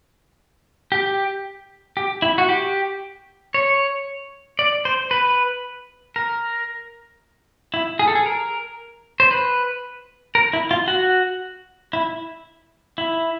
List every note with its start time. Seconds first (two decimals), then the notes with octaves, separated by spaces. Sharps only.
0.92 G4
1.97 G4
2.22 E4
2.38 F#4
2.49 G4
3.54 C#5
4.59 D5
4.85 C5
5.11 B4
6.16 A#4
7.74 E4
7.99 G#4
8.07 A4
8.15 G#4
8.26 A#4
9.20 C5
9.31 B4
10.35 A#4
10.53 E4
10.71 F4
10.88 F#4
11.93 E4
12.98 E4